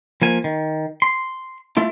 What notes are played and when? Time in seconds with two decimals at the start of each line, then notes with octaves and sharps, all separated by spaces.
0.22 F3 A#3 G#5
0.44 D#3
1.02 C6
1.77 A3 E4 F4